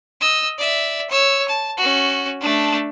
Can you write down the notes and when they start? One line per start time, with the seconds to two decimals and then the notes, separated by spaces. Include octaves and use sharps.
0.21 D#5 E6
0.58 D5 E5
1.10 C#5 E6
1.48 A5
1.77 C#4 F#4
2.40 A3 D4